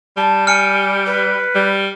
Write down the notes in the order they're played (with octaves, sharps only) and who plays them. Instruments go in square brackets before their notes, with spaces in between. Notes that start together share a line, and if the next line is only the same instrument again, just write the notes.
[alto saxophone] G3 [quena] A5
[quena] G#5 [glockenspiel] F6 C#7 D7
[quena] B4
[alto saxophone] G3